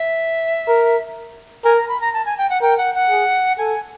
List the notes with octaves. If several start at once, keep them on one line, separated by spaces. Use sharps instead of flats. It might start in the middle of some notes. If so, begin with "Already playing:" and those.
Already playing: E5
A#4
A#4 G#5
A#5
B5
A#5
A5
G#5
G5
F#5
A#4 G5
F#5
F#5
G#4
A4 G#5